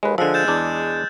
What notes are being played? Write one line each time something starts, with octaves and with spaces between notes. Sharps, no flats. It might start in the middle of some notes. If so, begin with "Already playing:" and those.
D#2 G#3 B4
D3 F3 G#3 E6 F#6
G6 A6 E7
E2 D4